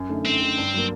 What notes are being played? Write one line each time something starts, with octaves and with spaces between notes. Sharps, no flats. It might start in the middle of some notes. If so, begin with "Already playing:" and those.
Already playing: F#2
D3 A3 D#4
F#2 C4
D3 A3 D#4
G2
F#3 A#3